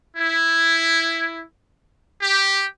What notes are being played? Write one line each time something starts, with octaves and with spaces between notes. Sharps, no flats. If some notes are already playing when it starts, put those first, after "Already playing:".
E4
G4